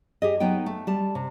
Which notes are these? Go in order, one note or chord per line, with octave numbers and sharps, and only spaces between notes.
G4 G#4 D#5
F#3 B3 D#4 G5
A3
G3 A5
C3